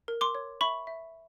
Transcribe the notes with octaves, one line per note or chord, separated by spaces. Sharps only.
A#4
C6 D6
C#5
E5 B5 C#6
E5